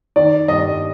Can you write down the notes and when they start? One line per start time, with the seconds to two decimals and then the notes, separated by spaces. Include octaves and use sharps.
0.16 D#3 D5
0.48 G2 D#5